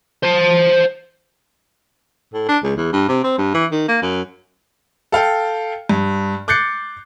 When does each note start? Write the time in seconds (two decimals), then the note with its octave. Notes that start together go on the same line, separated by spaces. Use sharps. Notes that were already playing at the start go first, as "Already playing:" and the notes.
0.24 C5 A5
2.34 A2
2.48 D4
2.63 C#2
2.77 E2
2.93 G2
3.08 C3
3.24 C4
3.38 G2
3.54 E3
3.71 D#3
3.88 A#3
4.02 F#2
5.12 A4 F5 G5
5.89 G2
6.48 D6 F#6 G6 A6 C7 C#7